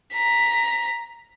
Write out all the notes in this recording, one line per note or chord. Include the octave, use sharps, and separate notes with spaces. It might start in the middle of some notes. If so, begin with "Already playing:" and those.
A#5 B6